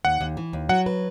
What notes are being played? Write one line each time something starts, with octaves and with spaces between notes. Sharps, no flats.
D#2 F#5
D#2
E3
D#2
F#3 F#5
B4